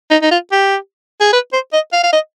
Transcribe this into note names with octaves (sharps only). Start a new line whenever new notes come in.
D#4
D#4
F4
G4
G#4
B4
C5
D#5
F5
F5
D#5